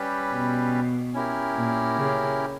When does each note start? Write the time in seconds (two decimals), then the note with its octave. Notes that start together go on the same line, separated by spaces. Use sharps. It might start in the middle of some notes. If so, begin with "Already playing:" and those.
Already playing: G3 C#4 G4 B4
0.31 B2
1.14 C#4 E4 G4 A#4
1.55 A#2
1.96 C#3